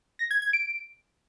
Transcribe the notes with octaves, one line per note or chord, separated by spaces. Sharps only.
A#6
G#6
G#6
D7